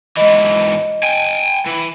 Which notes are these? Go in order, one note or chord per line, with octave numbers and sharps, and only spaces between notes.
G#2 E3 D#5
G5 G#5
E3